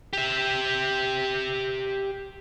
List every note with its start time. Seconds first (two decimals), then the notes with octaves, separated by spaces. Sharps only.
0.13 G4 E5